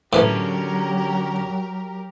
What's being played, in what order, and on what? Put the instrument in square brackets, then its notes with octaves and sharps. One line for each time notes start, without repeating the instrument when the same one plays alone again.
[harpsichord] A2 E3 A3 [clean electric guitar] D3 C#4 [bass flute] F#3 [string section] G4 A#4